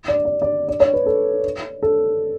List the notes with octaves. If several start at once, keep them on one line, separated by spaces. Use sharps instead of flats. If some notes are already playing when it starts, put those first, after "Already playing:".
D5
D5
D5
D5
C#5
B4
A4
A4